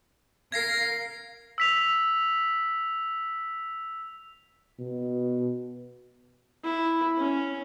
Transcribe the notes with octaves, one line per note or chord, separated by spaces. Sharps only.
A#4 F5 G#6 A#6 C7
E6 B6 F7
B2
E4
C#4